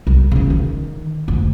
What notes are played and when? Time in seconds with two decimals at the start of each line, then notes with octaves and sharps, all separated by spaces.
0.07 C2 C#3
0.31 C#3 E3
0.50 D#3
1.28 F1 D2